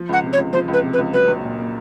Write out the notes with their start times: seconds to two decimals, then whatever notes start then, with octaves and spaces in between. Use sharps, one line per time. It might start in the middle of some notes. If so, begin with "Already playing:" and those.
Already playing: F3
0.09 C#2 F#5
0.24 C3
0.33 C#5
0.38 C#2
0.53 F3 C5
0.68 C#2
0.73 B4
0.83 C3
0.93 B4
0.98 C#2
1.13 F#3 B4
1.28 A#1
1.44 A#2
1.58 A#3